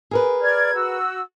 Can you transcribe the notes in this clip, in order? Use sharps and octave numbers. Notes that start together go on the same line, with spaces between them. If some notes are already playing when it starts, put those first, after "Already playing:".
G#4 A#4 B4
D5 F6 G#6
F#4 E6